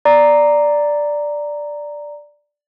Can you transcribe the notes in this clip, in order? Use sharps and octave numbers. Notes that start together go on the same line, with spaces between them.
D5 A#5